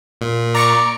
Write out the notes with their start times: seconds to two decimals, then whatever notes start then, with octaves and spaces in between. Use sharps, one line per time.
0.21 A#2
0.55 D5 A#5 C#6 C#7